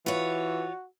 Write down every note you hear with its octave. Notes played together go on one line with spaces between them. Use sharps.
E3 F4 F#4 C#5